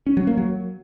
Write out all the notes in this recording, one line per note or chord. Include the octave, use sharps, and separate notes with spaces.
C#4
F#3
A#3
F#3